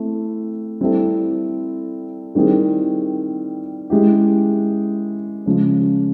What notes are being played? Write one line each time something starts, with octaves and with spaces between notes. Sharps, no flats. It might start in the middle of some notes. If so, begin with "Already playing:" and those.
Already playing: A3 C4 E4
G3 C4 E4 A4
D#3 G3 C4 E4 G#4
G#3 C#4 E4 G4
C#3 F3 G#3 C#4